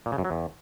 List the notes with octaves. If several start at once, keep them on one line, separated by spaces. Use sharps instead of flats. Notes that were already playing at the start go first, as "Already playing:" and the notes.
A#2
C#3
F#2
F#3
E2